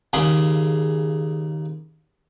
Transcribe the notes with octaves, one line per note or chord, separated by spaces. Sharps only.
D#2 C#3 G#4 B5 C6 D6